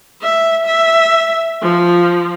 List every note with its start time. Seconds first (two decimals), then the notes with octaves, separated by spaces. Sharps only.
0.22 E5
0.67 E5
1.62 F3